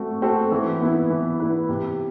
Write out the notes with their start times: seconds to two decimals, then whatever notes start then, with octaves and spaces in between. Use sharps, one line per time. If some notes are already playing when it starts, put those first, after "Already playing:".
Already playing: A3 C4 F#4 A4
0.22 C4 F#4 A4
0.52 E3
0.81 B3 E4 B4
1.10 E3
1.40 B3 E4 B4
1.69 C3